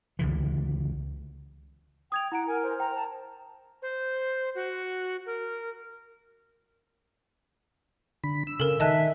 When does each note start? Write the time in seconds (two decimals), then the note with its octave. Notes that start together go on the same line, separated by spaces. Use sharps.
0.19 C#2 D3 E3
2.12 G5 D#6 G#6 F7
2.32 E4 F#5 A#5 D7
2.47 A#4 G#5
2.63 C5
2.80 G5 A#5
2.95 A5
3.82 C5
4.55 F#4
5.26 A#4
8.24 D3 B5
8.47 E6
8.60 C#3 A4 A#4
8.80 D#3 D#5 E5 G#5 A5 F#6